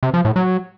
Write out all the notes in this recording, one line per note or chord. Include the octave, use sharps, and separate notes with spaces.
C3
F3
A2
F#3